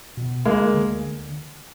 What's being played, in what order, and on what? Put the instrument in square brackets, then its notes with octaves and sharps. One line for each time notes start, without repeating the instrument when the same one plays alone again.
[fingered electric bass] B2
[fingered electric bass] D2 [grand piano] G#3 A#3
[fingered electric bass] D3